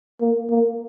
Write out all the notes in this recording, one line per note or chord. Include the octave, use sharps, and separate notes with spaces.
A#3
A#3